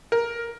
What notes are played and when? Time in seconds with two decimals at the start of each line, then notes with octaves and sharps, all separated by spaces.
0.12 A#4